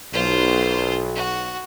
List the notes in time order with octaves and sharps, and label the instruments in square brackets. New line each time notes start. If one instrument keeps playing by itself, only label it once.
[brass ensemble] B1 [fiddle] F4 C5
[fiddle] F#4